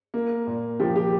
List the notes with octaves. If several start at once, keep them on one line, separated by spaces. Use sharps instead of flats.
A#3
A#2
F3 G4
G4